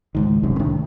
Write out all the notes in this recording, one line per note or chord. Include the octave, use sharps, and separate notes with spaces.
C#2 G#2 D#3
D#1 C2 F#2 C3
C2 A2 D#3 D4